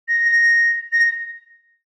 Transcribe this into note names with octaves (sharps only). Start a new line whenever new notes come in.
A#6
A#6
A#6